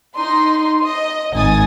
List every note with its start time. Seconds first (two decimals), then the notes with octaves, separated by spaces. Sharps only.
0.16 D#4 C6
0.84 D#5
1.34 G#1 D#4 G#5 D#6 A6